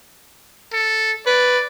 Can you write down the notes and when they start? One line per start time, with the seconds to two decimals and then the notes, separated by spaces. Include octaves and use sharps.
0.73 A4
1.26 B4 D5